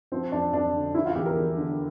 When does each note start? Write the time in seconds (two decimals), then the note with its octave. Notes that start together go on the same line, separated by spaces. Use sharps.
0.12 F3 C4
0.32 F2 D4
0.53 F2 D4
0.74 D3
0.94 F3 E4
1.05 F4
1.15 E2 G4
1.26 A#4
1.36 E2
1.57 D3